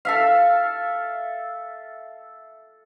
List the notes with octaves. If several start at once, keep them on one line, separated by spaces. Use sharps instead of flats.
A4 E5 F5